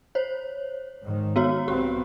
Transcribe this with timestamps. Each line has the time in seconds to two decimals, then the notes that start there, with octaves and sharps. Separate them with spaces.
0.15 C5 C#5
1.03 G#2 D#3
1.36 B3 F#4 C#5
1.68 B1 B3 C4 G4